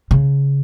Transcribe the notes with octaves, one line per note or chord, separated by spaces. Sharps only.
C#3